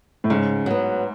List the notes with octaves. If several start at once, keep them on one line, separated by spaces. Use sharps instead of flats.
A2
G#2 C#3
F#3 B3